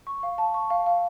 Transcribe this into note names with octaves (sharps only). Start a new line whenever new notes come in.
C#6
F5
A5
C#6
F5
F5